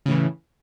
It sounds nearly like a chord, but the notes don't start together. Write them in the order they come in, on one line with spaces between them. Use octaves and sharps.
C#3 A2 E3